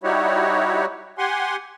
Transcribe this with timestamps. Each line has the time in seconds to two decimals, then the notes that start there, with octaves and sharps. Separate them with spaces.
0.04 G3 D#4 E4 F#4 G4 C#5
1.18 G4 F#5 G#5 C6